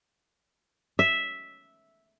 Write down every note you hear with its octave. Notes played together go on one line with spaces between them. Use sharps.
E5